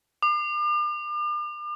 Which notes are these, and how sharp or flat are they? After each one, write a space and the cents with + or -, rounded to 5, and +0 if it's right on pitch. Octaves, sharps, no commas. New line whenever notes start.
D6 +40